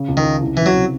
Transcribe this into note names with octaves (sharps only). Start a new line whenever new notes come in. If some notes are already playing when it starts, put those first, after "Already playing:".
Already playing: C#3
C#2
D#3
C#3
C2
C2 E3
F#3
C3